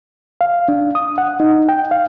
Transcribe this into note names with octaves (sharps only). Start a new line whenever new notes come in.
F5
D4
D#6
F#5
D#4
G5
F5